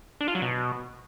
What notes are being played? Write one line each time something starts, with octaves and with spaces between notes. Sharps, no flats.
D4
F4
F#3
B2